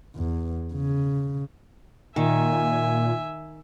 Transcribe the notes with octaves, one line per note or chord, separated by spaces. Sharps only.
E2
C#3
A#2 D#3 E5 G#5